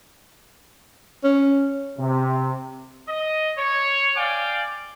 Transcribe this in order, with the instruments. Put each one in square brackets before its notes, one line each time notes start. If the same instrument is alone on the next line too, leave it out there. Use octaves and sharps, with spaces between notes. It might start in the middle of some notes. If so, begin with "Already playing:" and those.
[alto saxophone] C#4
[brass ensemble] C3
[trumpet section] D#5
C#5
D5 F5 G5 G#5 D6